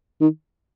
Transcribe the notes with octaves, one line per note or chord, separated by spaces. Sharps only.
D#3